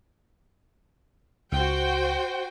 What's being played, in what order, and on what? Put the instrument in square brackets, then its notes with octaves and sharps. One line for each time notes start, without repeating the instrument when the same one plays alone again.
[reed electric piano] C#2 [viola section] F#4 C5 G5